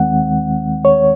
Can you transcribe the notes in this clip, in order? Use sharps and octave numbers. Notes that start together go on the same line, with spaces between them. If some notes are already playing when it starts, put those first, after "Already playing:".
Already playing: D#2 D#3 G#3 C4 F#5
C#5